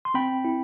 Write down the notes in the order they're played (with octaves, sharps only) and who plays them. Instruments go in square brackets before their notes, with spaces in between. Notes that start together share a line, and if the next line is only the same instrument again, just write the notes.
[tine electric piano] C6
C4 G5 B5
E4